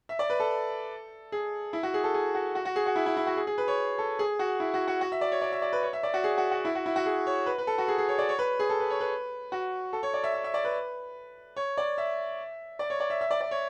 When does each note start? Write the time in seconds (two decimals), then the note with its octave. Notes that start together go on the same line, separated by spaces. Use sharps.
0.09 E5
0.19 D5
0.30 B4
0.40 A4
1.32 G#4
1.73 E4
1.83 F#4
1.94 G#4
2.04 A4
2.14 G#4
2.35 F#4
2.55 F#4
2.65 F#4
2.76 G#4
2.86 F#4
2.96 E4
3.06 E4
3.17 E4
3.27 F#4
3.37 G#4
3.47 G#4
3.58 B4
3.68 C#5
3.98 A4
4.19 G#4
4.39 F#4
4.60 E4
4.74 F#4
4.88 F#4
5.01 F#4
5.12 E5
5.21 D5
5.32 C#5
5.42 D5
5.52 E5
5.62 D5
5.73 B4
5.83 C#5
5.93 E5
6.03 D5
6.14 F#4
6.24 G#4
6.38 F#4
6.51 F#4
6.65 E4
6.75 F#4
6.86 E4
6.96 F#4
7.06 G#4
7.27 C#5
7.46 B4
7.58 B4
7.67 A4
7.78 F#4
7.88 G#4
7.98 G#4
8.08 C#5
8.18 D5
8.29 C#5
8.39 B4
8.59 G#4
8.70 A4
8.80 B4
8.90 C#5
9.00 B4
9.52 F#4
9.93 A4
10.03 C#5
10.14 D5
10.24 E5
10.34 E5
10.44 E5
10.54 D5
10.65 B4
11.56 C#5
11.77 D5
11.98 E5
12.79 D5
12.90 C#5
13.00 D5
13.10 E5
13.21 E5
13.31 D5
13.41 D5
13.51 C#5